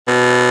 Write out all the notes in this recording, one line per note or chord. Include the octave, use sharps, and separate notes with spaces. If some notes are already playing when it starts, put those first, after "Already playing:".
B2